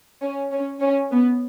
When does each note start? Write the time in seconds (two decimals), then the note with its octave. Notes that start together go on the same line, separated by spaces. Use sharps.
0.23 C#4
0.52 C#4
0.81 C#4
1.11 B3